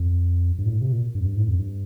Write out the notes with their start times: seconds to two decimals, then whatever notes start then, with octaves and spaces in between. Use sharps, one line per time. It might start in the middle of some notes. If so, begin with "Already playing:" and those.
Already playing: F2
0.58 G2
0.66 A#2
0.70 A2
0.82 C3
0.92 A#2
1.15 G2
1.20 F2
1.26 G2
1.37 A2
1.48 F2
1.59 G2